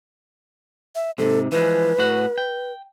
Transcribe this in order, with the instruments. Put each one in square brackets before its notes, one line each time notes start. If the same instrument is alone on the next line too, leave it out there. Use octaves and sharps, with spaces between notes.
[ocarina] E5
[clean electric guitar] G#2 C3 [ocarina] A4
[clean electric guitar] E3 F3 G#3 [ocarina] B4
[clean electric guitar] A2 F#4 F#5
G5